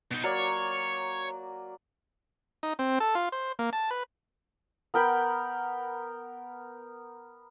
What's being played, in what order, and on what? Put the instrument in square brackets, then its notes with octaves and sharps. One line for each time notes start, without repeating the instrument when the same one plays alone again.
[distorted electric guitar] B2 D#4
[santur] F#3 A#3 D5 [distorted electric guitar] C#5
[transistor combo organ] D#4
C4
A4
F4
C5
A#3
A5
B4
[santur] B3 A#4 G5 B5